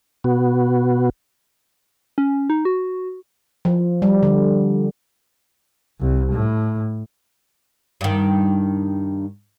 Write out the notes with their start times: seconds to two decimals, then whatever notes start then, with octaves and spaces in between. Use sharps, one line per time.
0.24 B2 B3 F#4
2.18 C#4
2.50 D#4
2.65 F#4
3.65 F3
4.02 G3
4.23 D3
6.00 C2
6.32 A2
8.01 G2 D#3